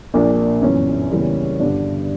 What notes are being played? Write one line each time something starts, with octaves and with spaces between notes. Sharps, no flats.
A#1 A#2 A#3 D4
G1 F#2 E3 C#4
E2 C#3 E3 G3 A#3
G1 G2 D3 G3 D4